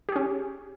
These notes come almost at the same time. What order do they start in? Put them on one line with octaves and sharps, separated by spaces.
G4 G#4 C#4